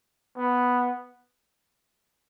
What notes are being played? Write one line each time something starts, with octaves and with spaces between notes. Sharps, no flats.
B3